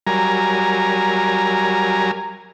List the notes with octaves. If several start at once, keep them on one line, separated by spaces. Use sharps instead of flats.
F#3 G3 A#4 G#5 A#5